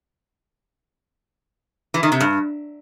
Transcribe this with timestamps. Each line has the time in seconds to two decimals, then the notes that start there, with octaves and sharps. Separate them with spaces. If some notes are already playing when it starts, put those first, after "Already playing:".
1.94 E3
2.03 D#3
2.12 C3
2.20 G2